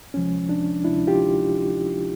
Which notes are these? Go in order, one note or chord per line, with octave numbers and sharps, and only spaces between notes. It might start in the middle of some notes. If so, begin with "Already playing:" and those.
D2 C3 F3 G#3 C#4
D4
D2 C3 F3 G#3 D4 E4
F4 G4